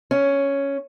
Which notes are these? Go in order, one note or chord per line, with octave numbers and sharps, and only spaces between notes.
C#4